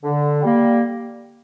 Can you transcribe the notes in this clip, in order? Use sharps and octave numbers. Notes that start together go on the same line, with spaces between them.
D3
G3 A#3